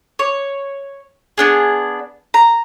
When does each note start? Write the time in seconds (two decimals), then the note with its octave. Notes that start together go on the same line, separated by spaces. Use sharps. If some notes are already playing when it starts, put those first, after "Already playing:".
0.19 C#5
1.38 B3 D4 G#4
2.34 A#5